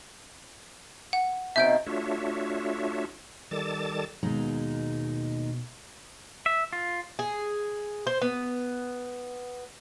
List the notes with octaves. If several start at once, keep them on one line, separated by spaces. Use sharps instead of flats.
F#5
B2 D#3 C4 E5 G6 D7
A3 D4 F4 F#4 C#5 E5
D#3 G3 A4 A5 D6 A6
D#2 B2 G#3 D#4
E5
F4
G#4
C5
B3